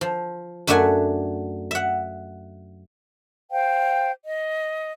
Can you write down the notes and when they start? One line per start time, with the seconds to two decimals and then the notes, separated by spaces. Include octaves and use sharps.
0.01 F3
0.67 F#2 A3 D4 E5 F#5 G#5
1.71 E5 F#5
3.51 C5 F5 G5
4.26 D#5